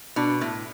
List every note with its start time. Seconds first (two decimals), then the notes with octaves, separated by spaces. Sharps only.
0.16 B2 D4
0.41 A2